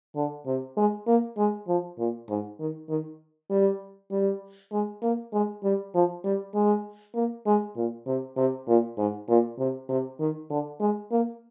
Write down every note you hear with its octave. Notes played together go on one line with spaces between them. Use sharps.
D3
C3
G#3
A#3
G#3
F3
A#2
G#2
D#3
D#3
G3
G3
G#3
A#3
G#3
G3
F3
G3
G#3
A#3
G#3
A#2
C3
C3
A#2
G#2
A#2
C3
C3
D#3
D3
G#3
A#3